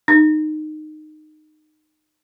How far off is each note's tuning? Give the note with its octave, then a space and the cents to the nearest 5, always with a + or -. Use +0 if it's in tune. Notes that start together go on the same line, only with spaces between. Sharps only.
D#4 -20